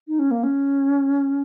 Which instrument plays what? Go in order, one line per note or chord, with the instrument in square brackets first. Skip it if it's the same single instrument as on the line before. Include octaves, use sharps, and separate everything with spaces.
[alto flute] D#4
C#4
A#3
C#4